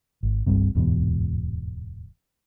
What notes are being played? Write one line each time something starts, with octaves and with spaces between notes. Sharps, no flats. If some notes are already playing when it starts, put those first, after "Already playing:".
G#1
G1 C2 G2 C3
D1 E2 G#2 B2